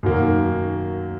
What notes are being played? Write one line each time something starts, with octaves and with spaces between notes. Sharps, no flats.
F#2 D#3 F#3 A#3